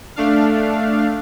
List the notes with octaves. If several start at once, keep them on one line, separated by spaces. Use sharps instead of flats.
A3 D4 F5